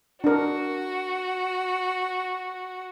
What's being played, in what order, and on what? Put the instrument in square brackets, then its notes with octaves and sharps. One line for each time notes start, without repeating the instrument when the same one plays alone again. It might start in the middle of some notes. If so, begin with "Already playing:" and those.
[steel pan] D4 A#4 [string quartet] F#4